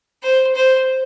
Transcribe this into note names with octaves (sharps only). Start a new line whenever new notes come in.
C5
C5